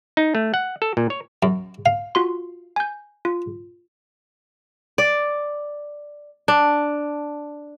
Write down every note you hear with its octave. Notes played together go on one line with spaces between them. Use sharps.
D#4
A3
F#5
A4
A#2
C#5
F#2
F5
F4 F#4 C6
G#5 G6
F4
D5
D4